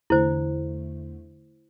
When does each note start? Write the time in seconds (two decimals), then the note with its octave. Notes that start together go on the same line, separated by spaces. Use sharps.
0.10 E2 D3 A3 E4 C5